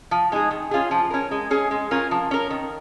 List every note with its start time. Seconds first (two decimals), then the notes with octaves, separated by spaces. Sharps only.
0.11 F3
0.32 G#3 D#4 G#4
0.51 D#3
0.71 C#4 F4 G#4
0.91 F3
1.10 C#4 A#4
1.31 G#3
1.51 C#4 G#4
1.71 G#3
1.91 C#4 F4 A#4
2.11 F3
2.31 C#4 A#4
2.50 D#3